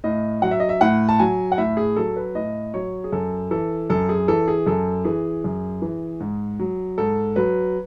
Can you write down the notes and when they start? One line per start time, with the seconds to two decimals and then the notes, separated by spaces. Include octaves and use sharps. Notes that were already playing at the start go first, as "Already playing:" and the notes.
0.04 A2 D#5
0.42 F#3 F#5
0.51 E5
0.60 D#5
0.69 E5
0.81 A2 F#5
1.09 A5
1.19 F#3 G#5
1.52 F#5
1.58 A2 E5
1.77 G#4
1.96 F#3 A4
2.16 B4
2.35 A2 D#5
2.74 F#3 C#5
3.04 G#4
3.12 F#2 A4
3.51 E3 A4
3.90 F#2 A4
4.09 G#4
4.28 E3 A4
4.48 G#4
4.66 F#2 A4
5.05 E3 G#4
5.44 F#2
5.82 E3
6.20 G#2
6.59 F#3
6.98 G#2 A4
7.36 F#3 B4